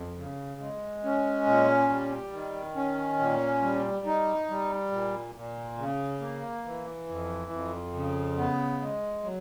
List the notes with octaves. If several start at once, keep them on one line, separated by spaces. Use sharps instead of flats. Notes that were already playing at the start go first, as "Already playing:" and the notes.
Already playing: F2
C#3
G#3
C#4
A#2
G3
D#3
C#4
A#2
G3
D#4
G3
A#2
A#2
C#3
A#3
E3
F2
F2
C#3
B3
G#3
F#3